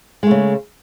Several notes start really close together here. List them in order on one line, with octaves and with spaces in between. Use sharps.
G#3 A3 C#3